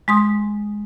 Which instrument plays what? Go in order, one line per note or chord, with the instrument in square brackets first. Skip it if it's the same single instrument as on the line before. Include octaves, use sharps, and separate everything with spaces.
[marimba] G#3 C6 D#6